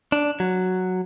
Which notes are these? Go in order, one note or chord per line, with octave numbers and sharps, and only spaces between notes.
D4
F#3